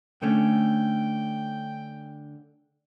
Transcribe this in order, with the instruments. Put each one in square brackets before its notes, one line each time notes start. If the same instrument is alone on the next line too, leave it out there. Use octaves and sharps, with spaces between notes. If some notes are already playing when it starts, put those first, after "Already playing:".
[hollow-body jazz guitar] D3 A3 C#4 [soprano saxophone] G5